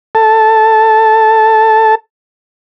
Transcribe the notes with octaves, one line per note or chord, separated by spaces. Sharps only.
A4 A5